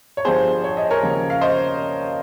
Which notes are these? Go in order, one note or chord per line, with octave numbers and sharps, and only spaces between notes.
C#5
G1 G2 F3 G#4 C5
C#5
D#5
A#4 C#5
D#2 C#3 F3
F5
C5 D#5